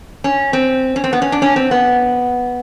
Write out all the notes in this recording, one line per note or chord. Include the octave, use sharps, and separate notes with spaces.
C#4
C4
C#4
C4
B3
C#4
D4
C#4
C4
B3